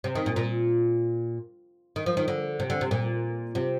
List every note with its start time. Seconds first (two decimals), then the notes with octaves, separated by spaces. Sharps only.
0.04 C3
0.15 D#3
0.26 A#2
0.36 A#2
1.96 D#3
2.06 F3
2.17 D#3
2.28 D3
2.60 C3
2.70 D3
2.81 C3
2.91 A#2
3.55 C3